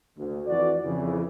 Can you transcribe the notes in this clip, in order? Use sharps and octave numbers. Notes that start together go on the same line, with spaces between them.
D2
F2 E3 F#4 D5
F2 C#3 E3